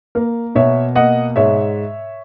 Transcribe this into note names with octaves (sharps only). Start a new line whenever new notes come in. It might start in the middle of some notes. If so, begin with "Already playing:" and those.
A#3 A#4
B2 C#5 E5
A#3 D#5 F#5
G#2 C#5 E5